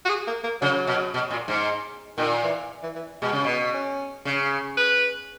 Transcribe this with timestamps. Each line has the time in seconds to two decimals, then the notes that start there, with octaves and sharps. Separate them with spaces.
0.05 F#4
0.09 G#4
0.27 A#3
0.44 A#3
0.61 C#3 F#3
0.87 B2
1.14 B2
1.31 A#2
1.48 G#2
2.18 A#2 D#3
2.44 E3
2.83 E3
2.95 E3
3.22 B2 G#3
3.33 C#3
3.44 B2 B3
3.74 C#4
4.25 C#3
4.77 B4